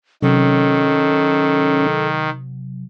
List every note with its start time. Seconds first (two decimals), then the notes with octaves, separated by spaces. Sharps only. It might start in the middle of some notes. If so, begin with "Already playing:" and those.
0.22 C3 D#3 F#3 C#4 A4